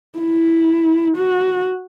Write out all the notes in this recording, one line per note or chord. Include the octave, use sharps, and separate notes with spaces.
E4
F#4